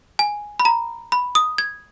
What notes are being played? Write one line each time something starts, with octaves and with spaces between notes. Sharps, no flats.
G#5
B5
A#5
B5
D#6
G#6